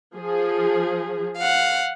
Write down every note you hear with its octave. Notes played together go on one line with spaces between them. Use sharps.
F3 G#4
F5 F#5